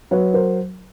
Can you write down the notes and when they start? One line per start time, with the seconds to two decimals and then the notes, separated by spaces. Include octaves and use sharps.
0.11 F#3 B4 C#5
0.34 A#4 C5